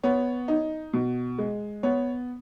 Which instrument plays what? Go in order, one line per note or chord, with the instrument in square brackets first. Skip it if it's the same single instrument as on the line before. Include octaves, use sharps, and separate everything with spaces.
[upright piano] B3 C#5
D#4
B2
G#3
B3 C#5